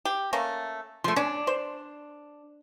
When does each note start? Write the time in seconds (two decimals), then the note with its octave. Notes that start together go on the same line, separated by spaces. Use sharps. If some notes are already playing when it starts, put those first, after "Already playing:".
0.05 G4
0.33 A3 A#3 C#4
1.04 F3 A3 C6
1.16 C#4 D4
1.47 C5